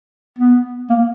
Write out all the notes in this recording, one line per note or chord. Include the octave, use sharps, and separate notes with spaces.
B3
A#3